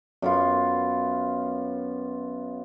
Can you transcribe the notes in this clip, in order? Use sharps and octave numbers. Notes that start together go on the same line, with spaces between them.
F#2 B3 F4